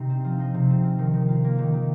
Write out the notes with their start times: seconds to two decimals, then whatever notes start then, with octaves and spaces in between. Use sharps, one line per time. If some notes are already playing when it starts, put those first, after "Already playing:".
Already playing: C3 D#4
0.10 C4
0.24 F3
0.39 D#4
0.54 C3
0.70 C4
0.83 F3
0.99 D#3
1.13 D#3
1.28 F4
1.44 A#3
1.58 D#3
1.74 D#3